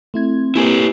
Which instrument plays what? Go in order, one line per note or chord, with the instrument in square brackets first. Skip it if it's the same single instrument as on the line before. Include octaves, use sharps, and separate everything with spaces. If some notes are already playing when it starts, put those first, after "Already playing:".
[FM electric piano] A3 E4 G#6 [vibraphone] C4
[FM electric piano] A#3 G#5 [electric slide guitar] E4 G4 B4